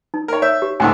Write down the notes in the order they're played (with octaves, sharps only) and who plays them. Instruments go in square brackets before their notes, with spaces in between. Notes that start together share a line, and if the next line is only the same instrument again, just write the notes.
[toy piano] D#4
[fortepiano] A#4 C#5
[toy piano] C#5 [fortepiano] E5
[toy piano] G4
[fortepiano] C#2 G#2 A3 [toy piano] F#5 G#5